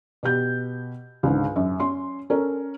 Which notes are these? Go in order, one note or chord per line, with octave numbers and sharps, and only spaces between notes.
B2 G4 G6
C#2 G#2 D3
F#2
C#4 C6
C#4 A4 A#4